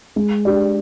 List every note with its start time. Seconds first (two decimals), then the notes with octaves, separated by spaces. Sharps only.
0.16 G#3
0.45 D4 G4 D5